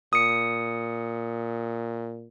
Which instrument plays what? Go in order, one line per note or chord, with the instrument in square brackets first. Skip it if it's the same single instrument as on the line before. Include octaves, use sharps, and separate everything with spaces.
[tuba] A#2 [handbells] D#6 C#7